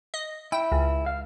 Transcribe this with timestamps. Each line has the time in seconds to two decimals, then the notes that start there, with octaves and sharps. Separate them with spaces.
0.14 D#5
0.52 E4 G5
0.72 C#2
1.06 F5